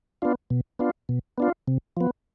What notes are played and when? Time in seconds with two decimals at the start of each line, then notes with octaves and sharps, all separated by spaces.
0.22 B3 D4 F4
0.50 B2
0.79 B3 D4 F4
1.09 B2
1.38 B3 D4 F4
1.68 C3
1.97 F3 B3